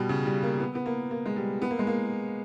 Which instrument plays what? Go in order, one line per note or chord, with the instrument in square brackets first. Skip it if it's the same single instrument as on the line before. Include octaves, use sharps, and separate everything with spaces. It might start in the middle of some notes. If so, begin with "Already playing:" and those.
Already playing: [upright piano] B2 G3
C#3
G3
A#3
B3
B3
A#3
A#3
G#3
G3
B3
A#3
G#3
A#3